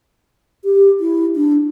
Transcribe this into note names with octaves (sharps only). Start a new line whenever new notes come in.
G4
E4
D4